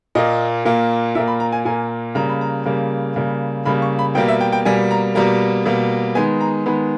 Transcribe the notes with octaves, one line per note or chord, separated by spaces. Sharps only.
A#2 A#3 D#5
A#2 A#3
A#2 A#3 E5
B5
A#5
G#5
A#2 A#3 G#5
C#3 G3 A#3 A#5
B5
A#5
C#3 G3 A#3
C#3 G3 A#3
C#3 G3 A#3 B5
C#6
B5
B2 G3 A#3 G5
E5
G5
G5
B2 G3 A#3 G#5
A#5
B2 G3 A#3 A#5
B2 G3 A#3
D#3 G#3 B3 G#5
A#5
D#3 G#3 B3 B5